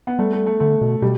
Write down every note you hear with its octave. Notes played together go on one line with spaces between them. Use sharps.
B3
G3 A3
A3
A3
D3 A3
B2
B2 G3